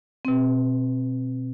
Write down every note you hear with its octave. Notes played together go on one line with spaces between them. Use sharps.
B2 C4